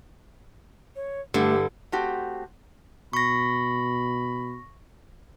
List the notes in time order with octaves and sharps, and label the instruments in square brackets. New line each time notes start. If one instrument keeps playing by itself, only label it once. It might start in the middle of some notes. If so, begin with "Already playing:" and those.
[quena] C#5
[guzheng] G2 D3 E4 [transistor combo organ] A3 [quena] G4
[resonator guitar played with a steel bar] A3 C4 F#4 G4
[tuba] B2 [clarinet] B5 [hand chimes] C#6 A#6